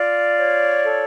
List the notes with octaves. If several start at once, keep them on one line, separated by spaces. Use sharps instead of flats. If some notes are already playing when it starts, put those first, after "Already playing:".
Already playing: F4 D5
C#5
A4